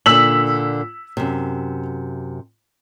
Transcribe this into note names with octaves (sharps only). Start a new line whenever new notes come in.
A#2 D3 E6 B6 F#7
F#2 C3